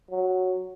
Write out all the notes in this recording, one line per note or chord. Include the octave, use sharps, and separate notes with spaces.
F#3